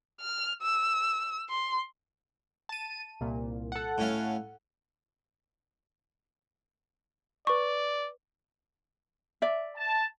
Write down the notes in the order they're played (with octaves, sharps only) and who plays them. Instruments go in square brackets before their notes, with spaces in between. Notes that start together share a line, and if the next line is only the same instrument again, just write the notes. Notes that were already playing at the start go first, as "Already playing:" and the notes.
[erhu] F6
E6
C6
[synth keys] A5 D#7
C2 A#2
A4 F#5
[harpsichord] A2 C#4 F5
[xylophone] B4 C#6 [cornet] D5
[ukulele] D5 E5
[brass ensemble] A5